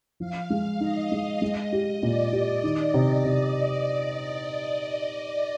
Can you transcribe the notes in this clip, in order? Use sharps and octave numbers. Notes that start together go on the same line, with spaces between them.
F3 F5
G#3
D#4 D#5
G#3
G#3 D#5
G4
A#2 D5
G4
D#3
C3
C3